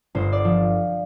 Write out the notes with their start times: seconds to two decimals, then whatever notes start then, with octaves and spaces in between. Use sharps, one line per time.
0.15 G1 C5
0.32 D5
0.45 F3